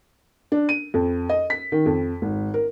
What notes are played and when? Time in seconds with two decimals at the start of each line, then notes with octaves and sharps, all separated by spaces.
0.52 D4
0.69 D#7
0.94 F2
1.29 D#5
1.50 B6
1.72 D#3
1.86 F2
2.22 G#1
2.54 A#4